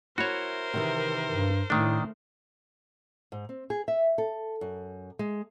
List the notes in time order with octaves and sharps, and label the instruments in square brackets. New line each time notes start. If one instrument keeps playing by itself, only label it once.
[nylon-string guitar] E4 [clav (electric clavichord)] F#4 C#5 [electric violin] A#4 C5
[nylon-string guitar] C3 D#3 E3
[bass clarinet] G2
[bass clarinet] A2 [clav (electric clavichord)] D#3 D4 [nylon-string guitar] A3
[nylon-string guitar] G#2
C4
G#4
E5
A4
F#2
G#3